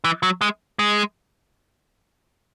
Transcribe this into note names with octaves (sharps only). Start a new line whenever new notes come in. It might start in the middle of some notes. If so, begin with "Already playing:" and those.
E3
F#3
G#3
G#3